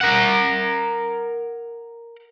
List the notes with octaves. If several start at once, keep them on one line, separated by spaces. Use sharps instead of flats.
A#4 F#5